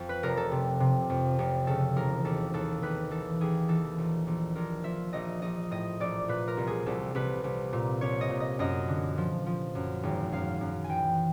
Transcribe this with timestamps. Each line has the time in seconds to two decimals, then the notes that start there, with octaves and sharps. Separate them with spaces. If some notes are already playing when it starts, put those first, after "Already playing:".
Already playing: F2
0.09 B4
0.23 F1 A#4
0.37 A4
0.52 C3
0.80 C3
1.10 F2
1.39 F1
1.67 C#3 A4
1.96 E1 A#4
2.25 D#2 A4
2.54 D#2 A4
2.82 D#2 B4
3.11 E3 A4
3.41 D#2 G#4
3.69 E3 A4
3.98 A#1
4.27 A#1
4.56 A#1 A#4
4.84 F3 E5
5.13 A#1 D#5
5.42 A#1 D#5
5.71 A2 D#5
6.00 A#1 D5
6.28 A#2 B4
6.48 A#4
6.57 C2
6.67 G#4
6.86 C2 A4
7.15 C2 B4
7.44 C2
7.73 A#2
8.01 C2 C#5
8.21 D#5
8.30 A#2
8.40 D#5
8.59 F#2 D#5
8.88 D3
9.18 F3
9.46 F3
9.75 F#2
10.03 G#1
10.32 F#2 F5
10.61 F#2
10.84 G#5
10.89 E3 G5